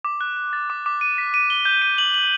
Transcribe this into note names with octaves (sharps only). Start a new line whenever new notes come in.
D6
F#6
F#6
A6
D6
D6
D#7
B6
D#7
G7
G6
D#7
F#7
F#7